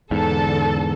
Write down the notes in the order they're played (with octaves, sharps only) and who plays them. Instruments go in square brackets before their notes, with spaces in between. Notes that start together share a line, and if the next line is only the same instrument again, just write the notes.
[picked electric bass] E2 G#2 [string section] D3 A4